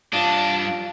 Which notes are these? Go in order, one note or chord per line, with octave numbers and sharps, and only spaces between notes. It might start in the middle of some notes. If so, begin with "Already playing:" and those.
G2 G3 D4 F4 D#5 A5